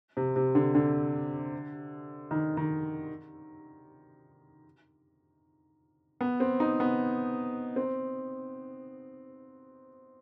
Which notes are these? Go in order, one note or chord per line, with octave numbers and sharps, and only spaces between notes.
C3
C3
D3
D3
D#3
D#3
B3
C4
D#4
B3
C4